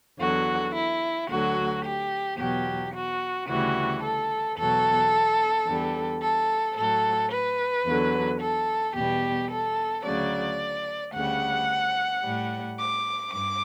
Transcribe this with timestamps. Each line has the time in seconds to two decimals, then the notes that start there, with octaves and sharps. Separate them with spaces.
0.19 E2 D3 F#3 F#4
0.74 E4
1.29 D2 D3 F#3 F#4
1.84 G4
2.38 E2 B2 F#3 G4
2.93 F#4
3.49 D2 C#3 E3 G3 F#4
4.02 A4
4.57 E2 B2 F#3 A4
5.67 E2 D3 G3
6.21 A4
6.76 A2 F#3 A4
7.31 B4
7.86 E2 D3 F#3
8.40 A4
8.95 E2 B2 G3 G4
9.50 A4
10.04 D2 C#3 F#3 D5
11.14 D2 C#3 G3 F#5
12.23 A2 G3
12.78 D6
13.33 G2 D6